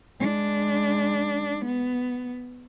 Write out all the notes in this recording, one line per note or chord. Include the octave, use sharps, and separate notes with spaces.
G#3 D4
B3